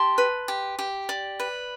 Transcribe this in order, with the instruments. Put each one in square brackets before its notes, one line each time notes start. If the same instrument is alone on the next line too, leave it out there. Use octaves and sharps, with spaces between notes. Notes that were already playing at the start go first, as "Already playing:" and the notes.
Already playing: [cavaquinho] G4 A5 C6
B4
G4
G4
D5
B4